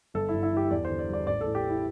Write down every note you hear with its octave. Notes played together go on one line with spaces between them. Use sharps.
G1 A4
G2 E4
E4
E3 G4
E2 D5
D3 C5
D5
G3 D5
A1 D5
A2 A4
G4
A3
E4